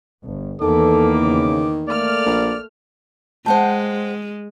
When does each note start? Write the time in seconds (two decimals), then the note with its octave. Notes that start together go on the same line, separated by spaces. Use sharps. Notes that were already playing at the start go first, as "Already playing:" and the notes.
0.24 G1
0.62 E2 D#3 E3 A#3 A4 D6
1.23 C#3
1.88 A3 A#3 D5 F6
2.26 A#1
3.46 G#3 C5 F#5 G5 A5